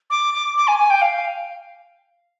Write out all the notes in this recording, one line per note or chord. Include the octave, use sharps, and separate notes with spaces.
D6
D6
D6
G#5
G#5
G5
F5